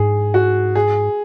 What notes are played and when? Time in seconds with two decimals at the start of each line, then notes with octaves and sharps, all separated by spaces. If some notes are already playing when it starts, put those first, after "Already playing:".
Already playing: G#2 G#4
0.34 F#4
0.75 G#4